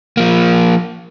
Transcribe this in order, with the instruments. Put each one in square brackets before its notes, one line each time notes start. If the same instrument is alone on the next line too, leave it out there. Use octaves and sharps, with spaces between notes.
[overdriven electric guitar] F3 A#3